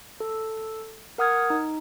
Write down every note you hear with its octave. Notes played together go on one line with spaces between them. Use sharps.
A4
A#4 F#5 D#6 F6 G#6
D#4